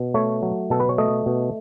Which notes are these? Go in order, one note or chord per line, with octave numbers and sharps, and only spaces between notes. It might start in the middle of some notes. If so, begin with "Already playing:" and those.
Already playing: B2
A3 C#5
F#3
B2 A4
B4
C#5
A3 D#5
B2